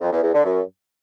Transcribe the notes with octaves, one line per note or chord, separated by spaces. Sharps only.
F2
E2
E2
D3
F#2